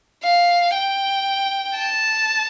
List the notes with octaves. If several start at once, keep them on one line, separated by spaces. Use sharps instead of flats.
F5
G5
A5